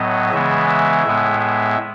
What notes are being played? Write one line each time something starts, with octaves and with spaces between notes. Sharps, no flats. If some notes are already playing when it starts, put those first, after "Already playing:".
Already playing: A2 F#3 B3 D#5
C#3 E3 G#3 B3 E5
E5
A2 G#3 B3
E5